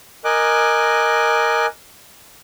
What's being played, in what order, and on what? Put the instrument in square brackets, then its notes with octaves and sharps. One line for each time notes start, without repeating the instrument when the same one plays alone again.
[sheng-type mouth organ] A#4 D#5 G#5 D6 F#6